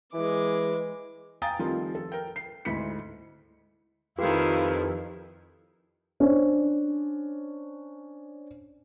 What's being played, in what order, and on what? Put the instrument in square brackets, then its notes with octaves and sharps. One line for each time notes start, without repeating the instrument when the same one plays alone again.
[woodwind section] E3 [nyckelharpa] G#3 D6
[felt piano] F5 G5 G#5 A#5 D#6 A6
D#3 F3 G3 A3 C4 F4
A4
A#4 G5
C7
D2 G#2 E4 B6 C#7
[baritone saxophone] F2 [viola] D#3 E4 [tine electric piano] F4 G4 B4 [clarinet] F5
[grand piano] C#4 D4 C5